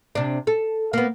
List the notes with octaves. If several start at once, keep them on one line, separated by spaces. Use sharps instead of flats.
C3 D4
A4
A#3 B3